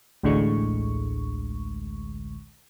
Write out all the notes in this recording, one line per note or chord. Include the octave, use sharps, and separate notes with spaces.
A1 D2 A2 D3 G#3 C#6